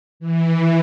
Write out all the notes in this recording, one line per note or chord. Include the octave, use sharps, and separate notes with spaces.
E3